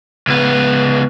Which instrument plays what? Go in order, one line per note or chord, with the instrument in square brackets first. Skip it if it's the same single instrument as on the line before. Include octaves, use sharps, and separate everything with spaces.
[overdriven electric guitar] C#2 B3